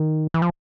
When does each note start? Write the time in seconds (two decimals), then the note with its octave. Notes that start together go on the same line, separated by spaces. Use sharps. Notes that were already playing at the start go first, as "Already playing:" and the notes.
Already playing: D#3
0.34 E3
0.42 F3